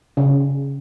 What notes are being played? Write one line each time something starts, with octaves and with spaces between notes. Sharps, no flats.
C#3